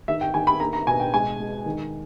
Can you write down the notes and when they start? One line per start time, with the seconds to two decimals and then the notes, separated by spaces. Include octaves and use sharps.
0.08 D#3 E5
0.21 G5
0.34 D#3 G#5
0.47 B5
0.60 A#3 A#5
0.73 A#5
0.87 B2 G#5
1.00 G5
1.14 G#3 G#5
1.40 G#3
1.66 D#3